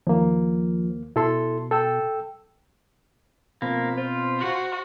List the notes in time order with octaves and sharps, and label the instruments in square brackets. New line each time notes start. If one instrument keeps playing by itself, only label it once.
[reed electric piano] D#2 A#3 [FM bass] F3
[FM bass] B2 [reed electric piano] E4 A4 C6
[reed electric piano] A4 G5 E6
[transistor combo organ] B2 C4 B5 [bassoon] F3 [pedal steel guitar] A#3
[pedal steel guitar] F4 [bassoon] C5
[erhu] F#4